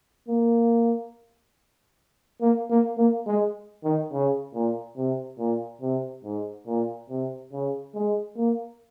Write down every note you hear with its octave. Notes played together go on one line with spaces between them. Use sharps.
A#3
A#3
A#3
A#3
G#3
D#3
C#3
A#2
C3
A#2
C3
G#2
A#2
C3
C#3
G#3
A#3